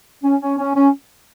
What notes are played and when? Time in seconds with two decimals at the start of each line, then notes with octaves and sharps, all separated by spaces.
0.23 C#4
0.41 C#4
0.58 C#4
0.75 C#4